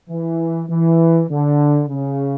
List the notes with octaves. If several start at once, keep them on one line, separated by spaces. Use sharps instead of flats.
E3
E3
D3
C#3